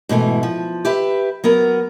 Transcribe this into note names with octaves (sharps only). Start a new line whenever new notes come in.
G#2 B2 E3 A3
F3
G4 B4 E5
F#3 B3 A#4